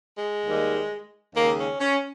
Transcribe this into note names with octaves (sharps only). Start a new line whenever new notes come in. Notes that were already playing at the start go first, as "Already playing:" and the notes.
G#3
D#2 D#3 G3
D#2 C#3 G#3 A#3
C#4
C#4